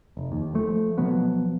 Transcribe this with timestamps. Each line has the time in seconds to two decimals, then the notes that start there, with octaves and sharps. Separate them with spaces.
0.17 F1
0.32 D#2
0.54 F3 A3
0.98 B2 F3 F#3 B3